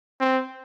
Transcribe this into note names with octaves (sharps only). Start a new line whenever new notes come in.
C4